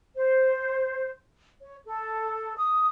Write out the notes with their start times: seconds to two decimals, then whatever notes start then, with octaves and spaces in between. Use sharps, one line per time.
0.15 C5
1.61 C#5
1.87 A4
2.57 D#6